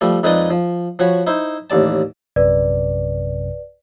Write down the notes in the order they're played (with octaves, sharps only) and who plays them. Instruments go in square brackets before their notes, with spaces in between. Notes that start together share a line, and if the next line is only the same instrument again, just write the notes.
[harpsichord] F3 G3 A3
F2 G#3 D#4 B4 D5 D#6
F3
F3 F#4 C#5 B5
D#4 E4 C5
A1 D#2 D5 A5
[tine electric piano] A#1 F#2 C3 [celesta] B4 D5